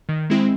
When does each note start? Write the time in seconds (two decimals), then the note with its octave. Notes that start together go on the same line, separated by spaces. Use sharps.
0.09 D#3
0.30 G#3 C4 E4